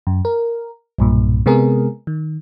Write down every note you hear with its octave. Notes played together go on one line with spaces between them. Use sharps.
F#2
A#4
B1 G2 A#2
C3 G#3 B3 G#4 A#4
D#3